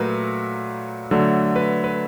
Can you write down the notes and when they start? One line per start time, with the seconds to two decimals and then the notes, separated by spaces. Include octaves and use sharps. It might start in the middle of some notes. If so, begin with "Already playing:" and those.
Already playing: A#2 F#3 A3 F#4 A#4 B4
1.11 D3 F#3 A3
1.56 B4
1.84 B4